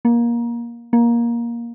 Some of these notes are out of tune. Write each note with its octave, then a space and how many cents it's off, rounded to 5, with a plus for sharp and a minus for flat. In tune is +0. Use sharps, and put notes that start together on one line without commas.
A#3 +20
A#3 +15